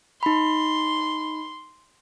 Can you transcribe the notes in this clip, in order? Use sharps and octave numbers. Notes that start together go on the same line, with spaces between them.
D#4 B5 C6